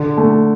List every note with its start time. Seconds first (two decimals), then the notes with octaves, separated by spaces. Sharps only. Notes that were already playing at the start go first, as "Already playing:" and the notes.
Already playing: D3
0.17 A3